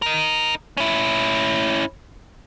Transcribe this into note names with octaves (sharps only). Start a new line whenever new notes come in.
D#4 A#4
C#4 E4